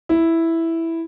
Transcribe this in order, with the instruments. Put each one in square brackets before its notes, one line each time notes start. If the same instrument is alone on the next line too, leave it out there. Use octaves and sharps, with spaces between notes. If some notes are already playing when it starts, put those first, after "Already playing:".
[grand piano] E4